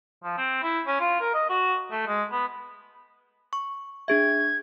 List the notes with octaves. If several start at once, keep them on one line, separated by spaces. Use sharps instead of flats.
F3
C4
E4
C#4
F4
A#4
D#5
F#4
A3
G#3
B3
C#6
D4 G#4 E5 G#6